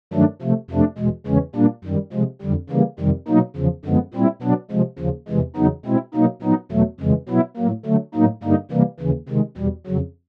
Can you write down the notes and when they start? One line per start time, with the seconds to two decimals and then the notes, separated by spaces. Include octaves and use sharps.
0.13 G2 D#3 F#3 A3 D4
0.42 C3 F3 A3
0.70 F2 C3 F3 A3 D4
0.98 E2 B2 G#3
1.27 E2 C#3 E3 G#3 C#4
1.55 A#2 G3 A#3 D4
1.84 F#2 D#3 G3
2.13 C3 F3 G#3
2.42 F2 D3 G3
2.70 C#3 E3 G3 A#3
3.00 F2 C3 D#3 G3
3.28 B2 F#3 A#3 D#4
3.56 E2 C#3 F3
3.85 F#2 D3 F3 G#3 B3
4.14 A#2 G3 C4 E4
4.42 B2 F#3 B3 D4
4.71 C3 F3 G#3
4.99 D#2 C#3 F3
5.28 E2 C3 E3 G#3
5.56 E2 C#3 F#3 B3 D#4
5.86 B2 G#3 C4 E4
6.14 B2 F#3 A#3 D#4
6.42 A#2 F#3 B3 D#4
6.72 E2 B2 F#3 A3
7.00 F2 C#3 E3 G#3
7.29 B2 F#3 B3 E4
7.57 A2 F#3 A#3
7.86 D3 F#3 A3
8.15 A2 F#3 A#3 D#4
8.43 G2 D3 G3 A#3 D#4
8.71 C3 E3 G3 A#3
9.00 D#2 C#3 E3
9.29 C3 D#3 G#3
9.57 E2 B2 G3
9.86 F2 C#3 F#3